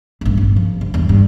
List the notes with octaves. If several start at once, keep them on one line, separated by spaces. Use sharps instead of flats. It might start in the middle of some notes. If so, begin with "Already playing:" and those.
A1 G2
G1
F3
D3
E2 G2
G2 G#3